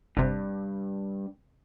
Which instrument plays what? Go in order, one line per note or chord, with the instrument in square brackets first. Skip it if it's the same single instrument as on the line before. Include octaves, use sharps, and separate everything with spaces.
[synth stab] G1 C3 [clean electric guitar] G2